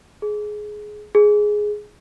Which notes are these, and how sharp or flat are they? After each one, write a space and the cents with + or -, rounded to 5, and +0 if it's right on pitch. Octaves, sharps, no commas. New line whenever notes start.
G#4 +15
G#4 +5